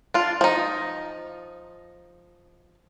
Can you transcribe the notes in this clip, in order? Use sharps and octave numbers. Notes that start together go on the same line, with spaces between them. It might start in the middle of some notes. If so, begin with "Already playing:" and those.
D4 F4
F3 D#4